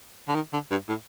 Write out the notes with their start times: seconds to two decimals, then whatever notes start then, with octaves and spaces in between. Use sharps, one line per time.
0.28 D3
0.35 D#3
0.53 D3
0.71 G2
0.89 A2